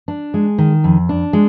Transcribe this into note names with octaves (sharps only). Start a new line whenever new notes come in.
D4
G#3
D#3
F2
D4
G#3